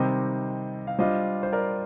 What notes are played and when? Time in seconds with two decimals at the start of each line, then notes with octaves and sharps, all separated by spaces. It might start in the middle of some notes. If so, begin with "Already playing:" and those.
Already playing: C3 D#3 G3 C4 D#4 C5 D#5
0.87 F5
0.99 G3 D4 F4 C5 D#5
1.43 C5
1.53 A#4 D5